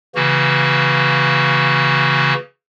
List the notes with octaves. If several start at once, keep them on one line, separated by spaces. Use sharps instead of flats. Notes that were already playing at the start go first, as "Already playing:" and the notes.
C#3 E3 A#3 F#4